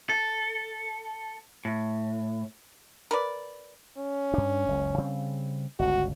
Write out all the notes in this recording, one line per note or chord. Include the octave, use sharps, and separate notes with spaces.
A4
A2
A#4 B4 D5
C#4
G2 D4
F#1 C#2
C#3 G3 C4
G1 C#2 F#4